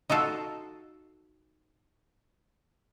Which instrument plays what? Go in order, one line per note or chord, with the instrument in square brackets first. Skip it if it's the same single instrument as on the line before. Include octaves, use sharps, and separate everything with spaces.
[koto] D#4 F4 F#4 A4